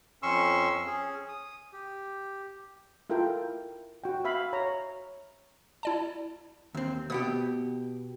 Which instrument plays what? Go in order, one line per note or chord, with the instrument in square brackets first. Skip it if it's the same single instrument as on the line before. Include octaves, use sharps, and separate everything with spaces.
[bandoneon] F2 C#4 C6 C#6 E6
C#4 G#4
D#6
G4
[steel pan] E4 F4 A4 A#4 G5
F#4 G5
E5 F5 B5
C#5 A#5
[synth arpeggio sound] E4 D5 A5
[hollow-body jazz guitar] D#2 C4
[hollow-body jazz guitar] B2 B3 G4 [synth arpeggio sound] D#6